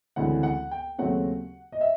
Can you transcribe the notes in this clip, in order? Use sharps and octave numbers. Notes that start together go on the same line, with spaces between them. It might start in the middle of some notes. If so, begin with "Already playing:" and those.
D2 C#3 E3 G#3 C4 F#5
F#5
G5
D#2 C#3 F#3 A3 C4 F#5
D#5
E5